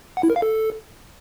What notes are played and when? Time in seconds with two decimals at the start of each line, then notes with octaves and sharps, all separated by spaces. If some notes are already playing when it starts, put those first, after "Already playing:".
0.17 F#5
0.23 E4
0.30 A#4
0.36 F5
0.42 A4